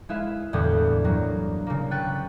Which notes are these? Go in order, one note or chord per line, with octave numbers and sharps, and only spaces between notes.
G#3 E4 B4 E5 F5
E2 A2 D3 G3 B3
G2 F#3 A#3
C#3 A#3
B4 G5 C#6 F#6 A6